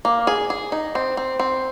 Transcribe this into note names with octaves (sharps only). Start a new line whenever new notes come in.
A#3
G#4
G#4
D#4
C4
C4
C4